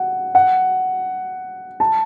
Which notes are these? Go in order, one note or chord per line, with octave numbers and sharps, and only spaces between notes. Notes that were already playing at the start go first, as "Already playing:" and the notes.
Already playing: F#5
F#5
A5